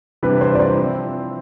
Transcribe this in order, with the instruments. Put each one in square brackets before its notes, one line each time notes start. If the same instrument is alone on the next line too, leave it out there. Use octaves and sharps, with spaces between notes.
[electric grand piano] C3 E3 G3 D4 [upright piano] B4
[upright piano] C5
D5
C5
[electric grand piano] F3 C4 E4